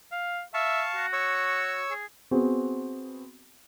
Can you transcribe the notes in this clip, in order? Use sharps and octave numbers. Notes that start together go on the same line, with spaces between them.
F5
E5 F5 A5 C#6
F#4
C#5 C#6 E6
G#4
B3 C4 F#4 G#4